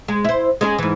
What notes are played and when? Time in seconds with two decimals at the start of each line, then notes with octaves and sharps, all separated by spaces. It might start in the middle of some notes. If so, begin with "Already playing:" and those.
0.08 G#3
0.25 E4 C5
0.61 G#3 C#4 G#4
0.78 G#2 E3